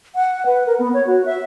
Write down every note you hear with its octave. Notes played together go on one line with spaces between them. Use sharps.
F#5
B4
A#4
B3
C#5
F#4
E5